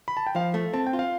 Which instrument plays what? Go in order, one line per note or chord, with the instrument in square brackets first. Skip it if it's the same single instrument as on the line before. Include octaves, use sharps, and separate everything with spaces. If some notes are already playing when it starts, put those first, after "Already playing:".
[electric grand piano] B5
A5
G5
[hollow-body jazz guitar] F3 [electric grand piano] F5
[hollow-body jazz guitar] A3
[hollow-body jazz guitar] C4 [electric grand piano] A5
[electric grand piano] G5
[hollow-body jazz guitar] F4
[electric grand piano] F5